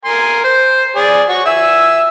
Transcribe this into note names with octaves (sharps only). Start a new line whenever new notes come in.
A#4 G#5 C6
C5
G#4 D5
F#4 C#5 C#6
E5 G#5 E6